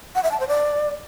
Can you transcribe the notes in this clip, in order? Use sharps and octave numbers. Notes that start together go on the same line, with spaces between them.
F#5
E5
A5
C5
D5